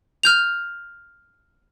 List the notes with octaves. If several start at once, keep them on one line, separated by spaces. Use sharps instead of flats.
F6 G6 F7